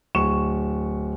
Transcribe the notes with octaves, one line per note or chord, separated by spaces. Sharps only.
D1 C#6 E7